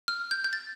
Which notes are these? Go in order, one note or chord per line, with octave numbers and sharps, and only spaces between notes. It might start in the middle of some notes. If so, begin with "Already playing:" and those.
F6
G6
G6
A6